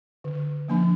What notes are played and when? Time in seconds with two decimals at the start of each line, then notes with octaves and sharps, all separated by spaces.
0.24 D3
0.68 F3 A#3 D4